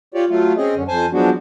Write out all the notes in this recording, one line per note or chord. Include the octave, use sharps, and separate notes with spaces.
F4 G4 C#5 D5
F#3 A3 F4
C4 C#4 G#4 D#5
F#2 D3 C#4
F2 C5 G#5 A5
F3 F#3 G#3 B3 D4 F#4